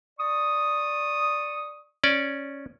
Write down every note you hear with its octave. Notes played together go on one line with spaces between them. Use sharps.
D5 C#6 D#6
C#4 D5